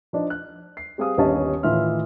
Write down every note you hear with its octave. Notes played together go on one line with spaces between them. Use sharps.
F3 D4 D#4
F#6
C7
G3 C4 G#4 F5 D#6
G1 D#2 G3 C#4 D#5 A5
A2 D#3 E3 F4 E5 F6